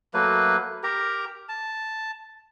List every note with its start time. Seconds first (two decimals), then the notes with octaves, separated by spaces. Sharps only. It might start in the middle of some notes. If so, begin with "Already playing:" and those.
0.14 F#3 A3 A#3 B4
0.83 G4 A#4 A#5
1.49 A5